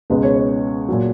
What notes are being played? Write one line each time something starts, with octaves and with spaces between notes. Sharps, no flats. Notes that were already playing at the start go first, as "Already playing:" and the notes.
C#2 B2 G#3 B4
C#5
C#5
A#2 F#3